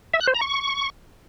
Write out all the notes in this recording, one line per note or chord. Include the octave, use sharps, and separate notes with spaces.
E5
F#6
C5
A#5
C#6